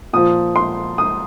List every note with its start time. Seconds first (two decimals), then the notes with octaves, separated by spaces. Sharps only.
0.13 A#2 F3 D#6
0.56 C6
0.98 D#6